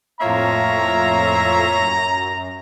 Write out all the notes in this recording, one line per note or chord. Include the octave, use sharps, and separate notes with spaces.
F2 A2 A#3 F4 C#5 E5 A#5
F#2